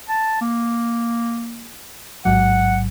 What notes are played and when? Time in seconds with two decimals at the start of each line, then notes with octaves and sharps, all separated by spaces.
0.09 A5
0.41 A#3
2.25 A1 G#2 F#3 F#5